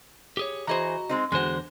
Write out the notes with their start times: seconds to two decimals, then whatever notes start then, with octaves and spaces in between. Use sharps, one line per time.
0.37 G4 G#4 C#5
0.67 E3 F#4 G#4 C5 D#5 A#5
1.09 G#3 C4 D#4
1.32 E2 D3 G#3 F#4 C5